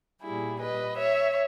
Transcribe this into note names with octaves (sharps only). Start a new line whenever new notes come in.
A#2 G3 E4 G#4
B4 D#5
C#5 E5